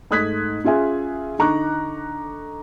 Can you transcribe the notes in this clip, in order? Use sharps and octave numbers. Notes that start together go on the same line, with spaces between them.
G#2 A3 D#6 F#6 G#6 B6
C#4 F4 G#4 E5 G#5
D3 D#4 A#5 C#6 D6 F#6